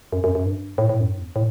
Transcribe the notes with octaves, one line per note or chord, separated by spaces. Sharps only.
F#2
F#2
F#2
G2
A2
A2
F#2
G2
E2
A2